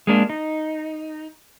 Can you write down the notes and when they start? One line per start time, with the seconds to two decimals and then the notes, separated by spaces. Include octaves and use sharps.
0.07 G#3 A#3 D4
0.30 D#4